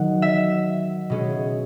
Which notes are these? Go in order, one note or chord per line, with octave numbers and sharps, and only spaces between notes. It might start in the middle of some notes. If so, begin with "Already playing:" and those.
Already playing: D#3 F#3 F#5
E5
B2 G#3 C#4